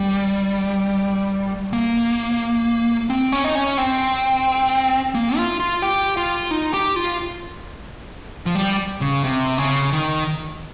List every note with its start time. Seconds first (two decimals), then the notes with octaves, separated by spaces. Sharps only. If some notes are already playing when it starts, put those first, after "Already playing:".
Already playing: G3
1.73 A#3
3.10 C4
3.32 C#4
3.45 D#4
3.55 C#4
3.78 C4
5.15 A#3
5.37 F4
5.60 F4
5.82 G4
6.17 F4
6.51 D#4
6.74 G4
6.96 F4
8.46 F3
8.55 G3
9.01 C#3
9.24 C3
9.58 C#3
9.93 D#3